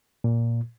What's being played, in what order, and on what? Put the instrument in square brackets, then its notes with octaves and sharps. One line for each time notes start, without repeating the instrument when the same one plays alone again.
[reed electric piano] A#2